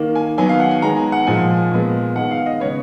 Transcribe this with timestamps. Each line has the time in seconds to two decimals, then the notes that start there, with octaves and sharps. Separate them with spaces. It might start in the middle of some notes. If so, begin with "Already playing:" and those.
Already playing: D#3 A#3
0.15 G#5
0.38 D#3 F#3 B3 G#5
0.49 F5
0.60 F#5
0.71 G#5
0.82 D#3 G#3 B3 A#5
0.97 G#5
1.12 F#5
1.27 A#2 F3 G#3 G#5
1.71 A#2 G#3 B3
2.16 D#3 G#3 B3 F#5
2.31 F5
2.46 D#5
2.60 C#3 G#3 B3 C#5